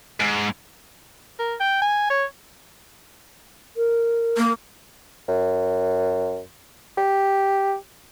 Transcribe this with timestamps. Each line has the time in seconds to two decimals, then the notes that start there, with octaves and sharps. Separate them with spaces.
0.20 G#2
1.39 A#4
1.60 G5
1.82 G#5
2.10 C#5
3.77 A#4
4.37 A#3
5.28 F#2
6.98 G4